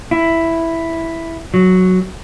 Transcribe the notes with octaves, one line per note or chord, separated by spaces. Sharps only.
E4
F#3